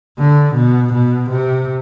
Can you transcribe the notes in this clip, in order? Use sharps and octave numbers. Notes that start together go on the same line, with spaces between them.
D3
B2
B2
C3